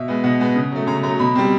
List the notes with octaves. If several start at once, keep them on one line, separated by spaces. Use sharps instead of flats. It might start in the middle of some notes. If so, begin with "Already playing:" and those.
Already playing: B2 E5
G#3 B3
B2 F#5
G#3 B3
C#3
F#3 A3
C#3 A#5
F#3 A3 A#5
B2 B5
G3 C4